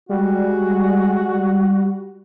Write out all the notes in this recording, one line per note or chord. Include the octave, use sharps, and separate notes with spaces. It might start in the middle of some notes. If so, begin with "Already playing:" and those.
G3 G#3 F#4